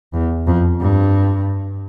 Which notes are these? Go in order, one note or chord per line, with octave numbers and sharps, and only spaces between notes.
E2
F2
G2